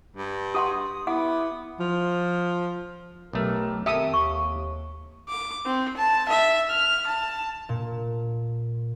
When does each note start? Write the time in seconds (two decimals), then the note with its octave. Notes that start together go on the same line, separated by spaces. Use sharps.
0.16 G2
0.54 G4 F#5 C6 D#6
1.07 B3 E4 F#5 D6
1.80 F3
3.33 B1 A3 G4 A#4
3.86 F2 D#3 G4 A4 E5 D#6
4.14 D#2 C#6
5.29 D6
5.66 C4
5.97 A5
6.29 E5
6.70 F6
7.07 A5
7.69 A#2